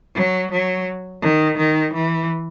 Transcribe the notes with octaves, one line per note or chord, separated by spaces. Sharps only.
F#3
F#3
D#3
D#3
E3